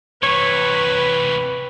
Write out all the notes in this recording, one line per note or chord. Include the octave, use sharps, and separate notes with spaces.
C3 E3 B4 C#5